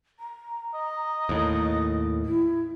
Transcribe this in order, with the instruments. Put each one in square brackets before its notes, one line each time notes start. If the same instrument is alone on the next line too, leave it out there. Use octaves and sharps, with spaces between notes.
[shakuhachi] A#5
[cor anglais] D#5
[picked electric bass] D#2 A2
[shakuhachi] E4